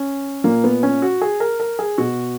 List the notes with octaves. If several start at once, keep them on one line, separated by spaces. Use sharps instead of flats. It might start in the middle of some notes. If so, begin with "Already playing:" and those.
Already playing: C#4
A#2 A#3
B3
C#4
F#4
G#4
A#4
A#4
G#4
B2 F#4